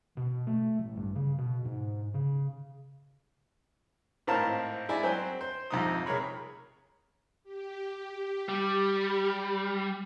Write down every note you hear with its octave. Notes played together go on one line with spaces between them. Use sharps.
B2
A3
A1
G2
C#3
B2
G#2
C#3
G#1 A2 C4 A#4 F5 A5
G#3 E4 D5 G#5 D6
F#3 C4 C5 G5 G#5
C5
F2 G#2 C3 D#4 A#5 D#6
C3 G#4 A#4 C#5 B5
G4
G3